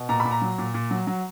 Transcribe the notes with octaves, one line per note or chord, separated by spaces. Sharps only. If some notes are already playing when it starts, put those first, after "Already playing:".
Already playing: B2
A#2 A#5
B5
A#2
A#5
F#3
A#2
A#2
F#3
F#3